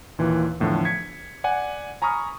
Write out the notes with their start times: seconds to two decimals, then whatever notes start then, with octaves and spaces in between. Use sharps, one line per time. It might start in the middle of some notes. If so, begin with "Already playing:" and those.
0.19 D#2 A#2 E3
0.60 E2 A2 D3 F3
0.85 G#6 B6 C#7
1.44 D5 F#5 G#5
2.02 G#5 A#5 B5 C#6 D#6 F6